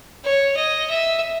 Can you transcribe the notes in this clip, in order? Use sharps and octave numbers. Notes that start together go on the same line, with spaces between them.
C#5
D#5
E5